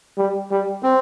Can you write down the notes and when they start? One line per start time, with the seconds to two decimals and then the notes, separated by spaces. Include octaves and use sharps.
0.17 G3
0.51 G3
0.83 C4